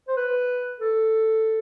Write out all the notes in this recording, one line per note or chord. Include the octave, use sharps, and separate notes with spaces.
C5
B4
A4